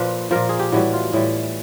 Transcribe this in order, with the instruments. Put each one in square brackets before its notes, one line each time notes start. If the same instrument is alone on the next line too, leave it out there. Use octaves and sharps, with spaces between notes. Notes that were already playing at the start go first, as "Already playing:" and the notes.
Already playing: [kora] A#2 F3 B4
A#2 F3 A#4
G#4
G4
A2 E3 G3 F#4
F4
A2 E3 G3